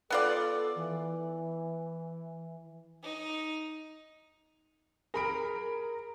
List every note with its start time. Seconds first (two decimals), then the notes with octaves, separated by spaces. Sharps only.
0.10 B3 F4 A4 D5
0.76 E3
3.03 D#4
5.14 G#4 A#4 B5 D7